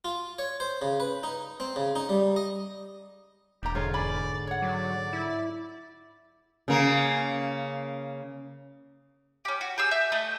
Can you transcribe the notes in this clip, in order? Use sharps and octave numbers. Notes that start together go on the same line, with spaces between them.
F4
C#5
C5
C#3
B4
D#4
C4
C#3
D#4
G3
D#5
E1 D4 G4 A#5
G#2 D3 G#3 F4 C#5
C#4 D5 G#5 B5
C#5 F#5
F#3 D5
E4
C#3 A#3
C#4 G4
F#4
G4 G#4 E6
E5 G6
A3 D#5